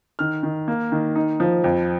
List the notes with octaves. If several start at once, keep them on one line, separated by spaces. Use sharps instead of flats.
D#3 F6
D#3
A#3
D#3
D#4
F3
F2